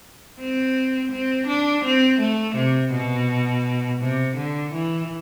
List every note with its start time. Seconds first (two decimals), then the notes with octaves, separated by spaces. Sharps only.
0.40 C4
1.11 C4
1.47 D4
1.84 C4
2.20 A3
2.56 C3
2.92 B2
4.02 C3
4.37 D3
4.74 E3